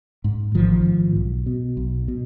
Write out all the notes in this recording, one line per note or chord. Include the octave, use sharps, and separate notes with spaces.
G#2
A1 D#3 F3
G#2
B1
B2
B1
B2